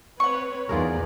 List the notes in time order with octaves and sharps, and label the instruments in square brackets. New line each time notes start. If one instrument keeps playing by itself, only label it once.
[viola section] C4 B4 C#5 [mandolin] F#5 C#6
[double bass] E2 [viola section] B3 D#4 D5 [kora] F4 G#4 A#4